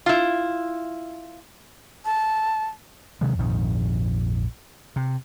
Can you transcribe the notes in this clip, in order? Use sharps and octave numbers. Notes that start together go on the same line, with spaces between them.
E4 F4
A5
C3 D#3 F#3 G#3
A#1 F2 G#2 D#3
C3